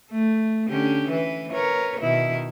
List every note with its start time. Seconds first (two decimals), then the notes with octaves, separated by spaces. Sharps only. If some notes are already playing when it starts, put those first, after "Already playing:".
0.11 A3
0.69 D3 C#4 G4
1.09 E3 B4
1.52 A#4 B4 C#5
2.00 B2 D#3 E4